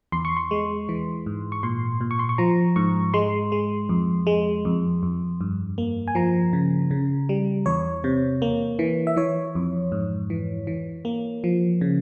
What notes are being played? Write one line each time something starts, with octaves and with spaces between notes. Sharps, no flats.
E2 C6
C#6
C6
G#3
E3
G#2
C#6
A#2 C6
A#2
C#6
C6
C#6
F3 A#5
G#2 C#6
G#3 C6
G#3
F2
G#3
F2
F2
G2
A#3
G#5
F3 A#5
C#3
C#3
G3
E2 C#5
C3
A#3
E3
E5
E3 C#5
F2
G#2
E3
E3
A#3
F3
C#3